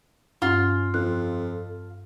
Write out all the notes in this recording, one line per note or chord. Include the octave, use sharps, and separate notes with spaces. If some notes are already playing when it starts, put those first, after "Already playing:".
G2 C#4 F4
F2 A4 F#6